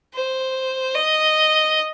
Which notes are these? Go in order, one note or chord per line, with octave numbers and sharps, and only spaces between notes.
C5
D#5